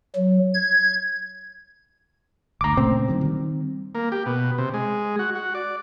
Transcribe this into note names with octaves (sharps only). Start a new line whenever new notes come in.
F#3
G#6
G1 D2 A#5 D6
A#2 C#3 A3 C4
D3 D#3 F#3
D#3 G3
A#3
G4
B2
C3
G#3
F#4
F#4
D5